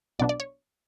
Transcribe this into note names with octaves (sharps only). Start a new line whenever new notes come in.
B1 B2 F#3 B3 D4 D5
D5
C#5